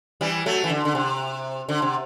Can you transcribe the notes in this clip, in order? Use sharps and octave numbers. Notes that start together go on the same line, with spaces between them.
E3 G3
F#3 A3
E3
D3
D3
C3
D3
C3